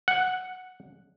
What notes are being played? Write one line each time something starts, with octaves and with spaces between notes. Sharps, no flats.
F#5